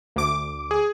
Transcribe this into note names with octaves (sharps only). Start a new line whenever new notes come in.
D2 D6
G#4